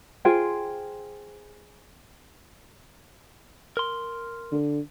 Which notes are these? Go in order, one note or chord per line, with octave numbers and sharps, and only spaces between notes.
F4 G#4 C5 G5
A#4 C6
D3